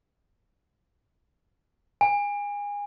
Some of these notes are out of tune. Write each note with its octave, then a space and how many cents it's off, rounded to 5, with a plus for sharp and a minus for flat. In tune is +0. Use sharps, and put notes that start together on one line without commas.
G#5 -25